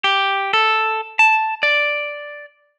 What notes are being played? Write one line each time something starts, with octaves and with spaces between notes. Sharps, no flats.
G4
A4
A5
D5